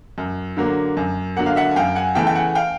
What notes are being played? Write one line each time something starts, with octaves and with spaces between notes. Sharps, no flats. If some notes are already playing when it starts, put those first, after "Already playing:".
F#2
D3 F#3 A#3
F#2
D3 F#3 A#3 F#5
F5
E5 F#5
G#5
F#2 F5 G5
F#5 G#5
C#3 E3 A3 G5 A5
G5
F#5 G#5
F5 G5